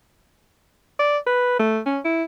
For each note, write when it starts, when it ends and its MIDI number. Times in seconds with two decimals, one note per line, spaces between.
0.99 1.18 74
1.26 1.55 71
1.59 1.80 57
1.86 1.99 61
2.05 2.23 64